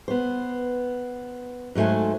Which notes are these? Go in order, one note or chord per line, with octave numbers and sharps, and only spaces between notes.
B3 C5
G#2 F#3 A3 C5 G#5